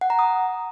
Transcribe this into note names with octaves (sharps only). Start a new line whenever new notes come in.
F#5
A#5
D#6